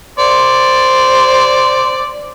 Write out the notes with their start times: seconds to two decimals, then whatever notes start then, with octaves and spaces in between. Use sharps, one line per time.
0.19 C5 D5